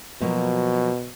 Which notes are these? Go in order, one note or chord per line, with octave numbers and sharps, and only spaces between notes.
B2 F3 F#3 A#3